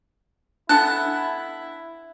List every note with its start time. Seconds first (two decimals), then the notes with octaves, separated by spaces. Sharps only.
0.69 B3 D4 E4 A4 A5 F#6